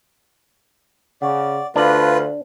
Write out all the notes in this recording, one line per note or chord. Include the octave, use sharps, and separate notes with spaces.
C#3 D5 F#5 C#6
D2 D4 F4 B4 F5 B5 F#7